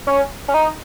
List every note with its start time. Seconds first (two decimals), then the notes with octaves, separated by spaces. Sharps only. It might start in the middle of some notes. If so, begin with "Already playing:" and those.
0.07 C#4
0.48 C#4
0.54 D#4